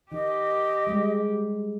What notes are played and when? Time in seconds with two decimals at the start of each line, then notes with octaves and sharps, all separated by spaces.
0.12 D#3 G4 D#5
0.87 G3 G#3